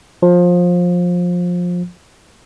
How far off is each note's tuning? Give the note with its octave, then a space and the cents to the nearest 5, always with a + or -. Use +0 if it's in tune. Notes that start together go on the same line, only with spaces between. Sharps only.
F3 +20